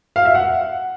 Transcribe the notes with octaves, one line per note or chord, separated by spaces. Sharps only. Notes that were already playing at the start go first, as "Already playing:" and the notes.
F5
E5
F#5